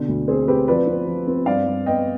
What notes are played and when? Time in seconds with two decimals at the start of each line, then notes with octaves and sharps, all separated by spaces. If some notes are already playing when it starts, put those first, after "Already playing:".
Already playing: B2 D3
0.08 D2
0.28 C4 G#4 C5
0.48 C4 G4 B4
0.68 F3 B4 D5
0.87 C4
1.07 F3
1.27 C4
1.46 G2 D5 F5
1.66 G2
1.86 B3 D#5 G5